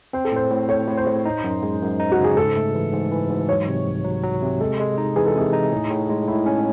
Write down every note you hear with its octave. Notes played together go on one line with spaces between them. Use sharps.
C4 C5
A4
A2 C5
A2
A2 C#5
A2
C5
A2
D#4
F#2
G#3
F#2
D#4
F#4
C#3
G#4
G#2 A4
A3
E3
G#2
E3
G#2
F#3 C#5
C3
C2
F#3
F#3
C3
G#3 A4
G#3
D#4
E3 G#4
A4
C3 G#4
D#4
A2
A2
G#3
A2 E4
C#4